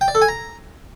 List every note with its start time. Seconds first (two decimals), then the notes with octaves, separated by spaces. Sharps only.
0.01 G5
0.08 D5
0.15 A4
0.22 G#5
0.28 A#5